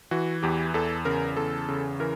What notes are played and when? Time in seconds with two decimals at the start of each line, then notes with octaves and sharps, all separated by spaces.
0.11 E3 F#4
0.43 E2 G4
0.74 E2 A4
1.05 C#3 A#4
1.37 E2 A4
1.69 C#3
2.00 E3 A#4